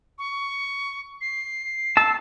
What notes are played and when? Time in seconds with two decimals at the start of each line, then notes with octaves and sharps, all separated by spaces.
0.18 C#6
1.21 C7
1.97 A5 E6